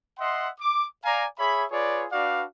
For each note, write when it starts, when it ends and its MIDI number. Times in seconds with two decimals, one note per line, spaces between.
0.20 0.49 75
0.20 0.49 76
0.20 0.49 78
0.20 0.49 84
0.60 0.87 86
1.04 1.25 74
1.04 1.25 77
1.04 1.25 80
1.04 1.25 82
1.39 1.64 68
1.39 1.64 73
1.39 1.64 76
1.39 1.64 83
1.71 2.05 65
1.71 2.05 68
1.71 2.05 71
1.71 2.05 73
1.71 2.05 74
2.12 2.44 62
2.12 2.44 66
2.12 2.44 71
2.12 2.44 74
2.12 2.44 77